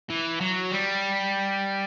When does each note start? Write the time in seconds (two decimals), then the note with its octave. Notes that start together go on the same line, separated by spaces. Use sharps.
0.10 E3
0.41 F#3
0.72 G3